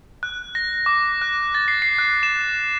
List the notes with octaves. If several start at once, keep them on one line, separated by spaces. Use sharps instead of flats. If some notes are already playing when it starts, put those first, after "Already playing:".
F#6
A#6
D6
F#6
A6
C7
C7
F#6
E7